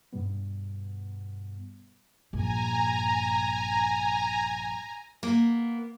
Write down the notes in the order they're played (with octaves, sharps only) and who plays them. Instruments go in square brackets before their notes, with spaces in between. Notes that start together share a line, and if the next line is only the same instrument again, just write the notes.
[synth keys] G2 B2 G3 B3
[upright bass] A#1 G2 [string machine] G#5 A#5
[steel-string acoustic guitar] A#3 B3